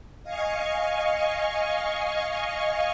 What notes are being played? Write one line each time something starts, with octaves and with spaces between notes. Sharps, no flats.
D#5 F5 G#5 C#6